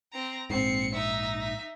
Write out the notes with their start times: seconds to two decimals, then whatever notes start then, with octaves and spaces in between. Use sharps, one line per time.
0.12 C4 A#5
0.50 A#1 G#2 C4 C7 C#7
0.94 D#4 E5
1.40 E5